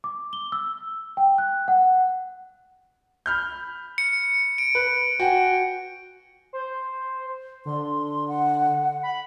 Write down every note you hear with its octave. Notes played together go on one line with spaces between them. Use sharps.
D6
G7
E6
G5
F#6
F#5
B5 F6 G6
C#7
D7
B4
F#4 G5 G#5
C5
D3 C6
F#5
B5